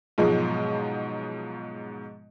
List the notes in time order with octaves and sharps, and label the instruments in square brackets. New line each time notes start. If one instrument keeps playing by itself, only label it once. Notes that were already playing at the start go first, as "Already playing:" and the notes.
[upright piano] G#2 B2 F3 F#3 G#3